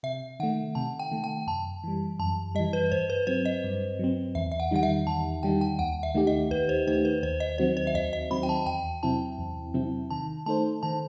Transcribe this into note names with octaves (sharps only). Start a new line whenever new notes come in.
C3 E5
D#3 A3 F#5
C3 A5
G5
D#3 A3
G5
F#2 A5
E3 G3
F#2 A5
E3 G3 D#5
B4
G2 C5
B4
F#3 C4 C5
D#5
G2
F#3 C4
E2 E5
E5
F#5
D#3 G3 D#4 F#5
E5
E2 A5
D#3 G3 D#4 G5
G5
D#2 F#5
E5
D#3 A3 D#4 G4
D#5
D#2 B4
C5
D#3 A3 D#4 G4 C5
B4
D#2 C5
D#5
D#3 F#3 C4 F#4 C5
C5
E5
D#2 D#5
D#5
D#3 F#3 C4 F#4 B5
G5
A5
E2 G5
C3 F#3 C4 E4 A5
E2
C3 F#3 C4 E4
D#3 A5
A3 D#4 A4 C5 A5
D#3 A5